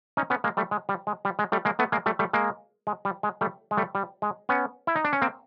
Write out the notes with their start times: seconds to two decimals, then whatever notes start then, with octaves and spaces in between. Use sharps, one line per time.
0.17 C#4 D#4
0.30 B3 C#4
0.44 G#3 A#3
0.57 G3 A3
0.71 G#3
0.89 G3
1.07 G#3
1.25 G3
1.39 G#3
1.52 G3 A3
1.65 G#3 A#3
1.79 A3 B3
1.92 G#3 A#3
2.06 G3 A3
2.19 G3 A3
2.33 G#3 A#3
2.87 G#3
3.05 G3
3.23 G#3
3.41 G3 A3
3.71 G#3
3.77 G3 A3
3.95 G3
4.22 G#3
4.49 B3 C#4
4.87 E4
4.95 D#4
5.04 D4
5.13 C#4
5.22 A#3 C4